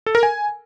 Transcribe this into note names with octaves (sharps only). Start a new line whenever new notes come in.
A4
A#4
G#5